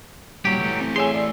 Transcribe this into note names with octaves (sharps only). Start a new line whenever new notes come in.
A#2 F#3 G3 G4
E3 A3
C4
G#4 C#5 E5 G#5 C6
D5